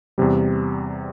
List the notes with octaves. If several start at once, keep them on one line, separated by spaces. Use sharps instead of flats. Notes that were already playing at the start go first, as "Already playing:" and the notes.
E2 C3 G3